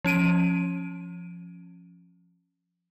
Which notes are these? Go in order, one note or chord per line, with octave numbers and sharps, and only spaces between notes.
F3 C#4 D7 D#7